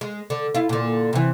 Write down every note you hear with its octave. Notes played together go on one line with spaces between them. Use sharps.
G#3
D3
E4 F4
A#2 D3
C3 E3